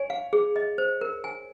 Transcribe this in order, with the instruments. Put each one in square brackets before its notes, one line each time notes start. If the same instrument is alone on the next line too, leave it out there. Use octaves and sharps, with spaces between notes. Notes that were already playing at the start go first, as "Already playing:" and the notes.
Already playing: [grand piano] C#5 [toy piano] G#5
[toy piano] F5
G#4
D#5
C5
A#4
G#5